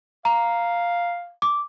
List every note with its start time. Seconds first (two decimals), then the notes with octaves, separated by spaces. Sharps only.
0.25 F5 A#5
1.42 D6